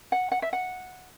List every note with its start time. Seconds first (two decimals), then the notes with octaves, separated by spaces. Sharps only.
0.12 F#5
0.32 F#5
0.42 E5
0.53 F#5